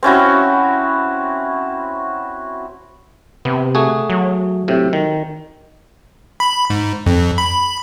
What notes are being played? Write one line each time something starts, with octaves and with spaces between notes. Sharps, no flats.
C4 C#4 E4 F#4
C3 B3
A3 F#4 G#4
F#3
A2 C3
D#3
B5
G#2
F2
B5